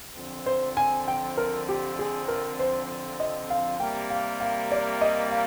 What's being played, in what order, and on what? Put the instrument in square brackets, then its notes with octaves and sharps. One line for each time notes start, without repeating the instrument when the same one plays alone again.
[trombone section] F2 D3 F3 C4
[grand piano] C5
G#5
G5
A#4
G4
G#4
A#4
C5
D#5
F5
[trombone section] C3 G3 A#3 [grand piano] G5
[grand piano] F5
F5
D5
D#5
F5